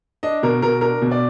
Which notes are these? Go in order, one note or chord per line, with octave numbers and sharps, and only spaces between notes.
D4 D#5
B2 A#4
B2 A#4
D4 A#4
B2
D5